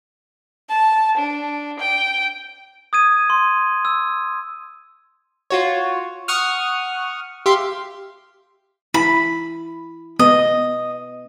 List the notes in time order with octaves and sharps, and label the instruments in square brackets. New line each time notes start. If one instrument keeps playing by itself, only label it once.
[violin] A5
D4
G5
[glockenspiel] D#6 G#6 D#7
C6
E6
[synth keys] F4 F#4 C#5
F#5 C#6 D#6 F6
G4 E5 F5 C6
[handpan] E4 [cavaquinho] B5
[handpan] B3 [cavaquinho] D#5